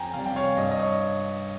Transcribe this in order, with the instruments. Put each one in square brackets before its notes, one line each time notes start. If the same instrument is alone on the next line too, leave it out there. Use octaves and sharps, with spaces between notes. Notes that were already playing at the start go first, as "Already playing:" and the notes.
Already playing: [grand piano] F2 G5 G#5 A#5
C3 F5 G#5
G3
G5
C#5 F5
G2 D#5
D#5
C#5